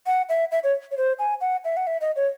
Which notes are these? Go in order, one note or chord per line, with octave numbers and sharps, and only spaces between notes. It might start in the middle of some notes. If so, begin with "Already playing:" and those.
F#5
E5
E5
C#5
C#5
C5
G#5
F#5
E5
F#5
E5
D#5
C#5